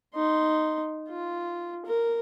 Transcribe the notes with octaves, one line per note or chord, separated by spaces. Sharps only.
D#4 C6
F4
A#4